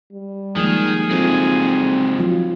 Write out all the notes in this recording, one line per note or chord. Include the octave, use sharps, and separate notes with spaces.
G3
D#3 F3 G#3 A#3 G#4
F#3 G#3 C4 D#4 F4 A4
F3 F#3 F4